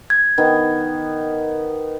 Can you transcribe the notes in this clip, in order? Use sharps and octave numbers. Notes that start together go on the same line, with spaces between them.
G#6
D#3 B3